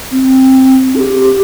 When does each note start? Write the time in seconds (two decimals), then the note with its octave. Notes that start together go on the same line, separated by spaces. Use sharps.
0.11 C4
0.95 A4
0.99 G4